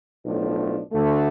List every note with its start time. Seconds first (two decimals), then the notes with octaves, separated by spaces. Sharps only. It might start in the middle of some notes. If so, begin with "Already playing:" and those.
0.24 B1 A2 F3 A3 D4
0.93 D2 D3 A3